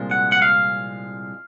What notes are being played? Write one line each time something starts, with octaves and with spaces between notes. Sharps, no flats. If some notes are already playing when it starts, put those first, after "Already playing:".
Already playing: C2 A#2 F3 G#3
F#5
F#5
F5